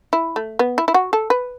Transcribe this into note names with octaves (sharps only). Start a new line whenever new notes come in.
E4
A3
B3
E4
E4
F#4
A4
B4